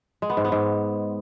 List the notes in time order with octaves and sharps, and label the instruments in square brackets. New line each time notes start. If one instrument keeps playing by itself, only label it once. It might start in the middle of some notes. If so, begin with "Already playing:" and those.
[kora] G#3
B3
G#2
B3
G#2